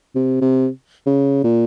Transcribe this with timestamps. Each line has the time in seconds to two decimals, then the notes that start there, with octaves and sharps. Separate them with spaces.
0.15 C3
0.41 C3
1.06 C#3
1.44 A#2